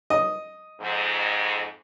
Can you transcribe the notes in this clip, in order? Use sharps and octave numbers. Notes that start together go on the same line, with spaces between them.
D#5
F2 G#2